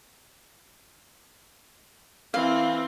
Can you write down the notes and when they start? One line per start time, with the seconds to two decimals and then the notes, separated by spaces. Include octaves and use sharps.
2.34 E3 C4 F5